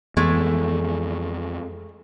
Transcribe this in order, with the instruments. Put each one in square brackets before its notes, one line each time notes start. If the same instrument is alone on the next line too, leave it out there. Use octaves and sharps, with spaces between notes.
[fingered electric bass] F2 E3 B3 [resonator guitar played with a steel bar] G#3 A3